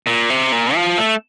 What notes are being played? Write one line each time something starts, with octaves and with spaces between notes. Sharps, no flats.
A#2
C3
A#2
F3
A3